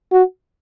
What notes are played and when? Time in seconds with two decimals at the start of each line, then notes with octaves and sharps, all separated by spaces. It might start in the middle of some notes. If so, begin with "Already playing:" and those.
0.12 F#4